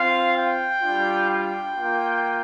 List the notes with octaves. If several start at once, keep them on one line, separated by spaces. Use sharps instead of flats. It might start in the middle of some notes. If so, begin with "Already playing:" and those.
Already playing: C4 F4 F5
G5
G3 D4 F4
G5
A#3 F4